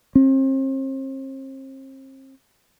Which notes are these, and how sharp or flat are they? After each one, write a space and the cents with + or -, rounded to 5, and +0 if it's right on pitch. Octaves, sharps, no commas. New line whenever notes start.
C4 +40